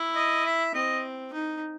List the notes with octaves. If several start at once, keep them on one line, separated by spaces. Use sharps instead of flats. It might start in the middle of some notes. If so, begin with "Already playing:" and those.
Already playing: E4
D#5
E5
C4 D#5
D#4